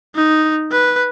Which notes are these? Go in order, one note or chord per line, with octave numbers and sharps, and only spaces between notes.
D#4
B4